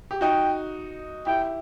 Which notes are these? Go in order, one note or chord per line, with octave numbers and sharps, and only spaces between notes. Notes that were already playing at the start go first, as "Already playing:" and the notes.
G4
D#4 F#4 G5
E4 G4 G5